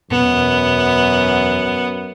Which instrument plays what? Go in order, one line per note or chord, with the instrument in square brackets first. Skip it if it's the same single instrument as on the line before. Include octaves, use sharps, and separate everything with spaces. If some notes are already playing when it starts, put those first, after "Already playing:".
[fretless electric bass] E1 B2 [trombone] F#2 [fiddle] B3